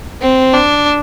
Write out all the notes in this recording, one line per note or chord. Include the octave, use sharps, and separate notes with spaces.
C4
D4